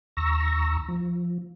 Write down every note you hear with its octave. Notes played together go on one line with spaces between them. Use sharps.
D#2 A#5 C#6 E6 A#6
F3